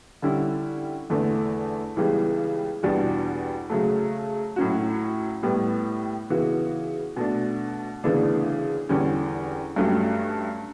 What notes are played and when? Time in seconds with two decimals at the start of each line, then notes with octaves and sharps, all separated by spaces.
0.22 D3 G3 C#4 E4
1.10 E2 D3 A3
1.96 C#2 C#3 E3 G3 B3
2.83 E2 B2 G3 D4 F#4
3.70 C#3 F#3 A3
4.56 A2 F#3 C#4 F#4
5.43 A2 G3 B3
6.30 C#3 E3 B3 F#4
7.16 B2 A3 D4
8.04 D2 C#3 E3 B3 D4
8.89 E2 D3 G3 C#4
9.76 G2 F#3 A3 C#4 G4